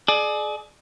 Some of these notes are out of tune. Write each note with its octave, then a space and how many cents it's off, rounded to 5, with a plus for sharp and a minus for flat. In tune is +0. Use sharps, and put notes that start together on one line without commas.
G#4 +35 D5 +30